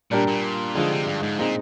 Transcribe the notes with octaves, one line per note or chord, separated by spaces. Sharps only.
A#2 G3 D4 G4 A#4
A#2
D3 D#3 F3 G#3
C3
G2
G#2
A#2 G#3 C4 D#4